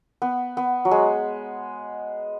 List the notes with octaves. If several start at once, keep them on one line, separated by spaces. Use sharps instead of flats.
B3
B3
F#3
G#3